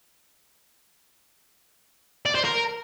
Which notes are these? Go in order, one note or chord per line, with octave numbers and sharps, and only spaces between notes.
D5
C5
A#4